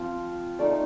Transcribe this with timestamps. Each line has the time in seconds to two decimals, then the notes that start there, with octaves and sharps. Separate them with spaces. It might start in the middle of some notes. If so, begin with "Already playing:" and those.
Already playing: F3 C4 F4
0.59 A3 D#4 D5